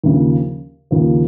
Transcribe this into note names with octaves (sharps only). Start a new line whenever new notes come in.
D#2 C#3 F3
D#2 C#3 F3